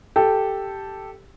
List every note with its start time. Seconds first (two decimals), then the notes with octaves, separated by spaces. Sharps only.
0.16 G4 A4